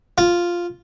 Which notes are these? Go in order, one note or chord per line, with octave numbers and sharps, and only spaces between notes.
F4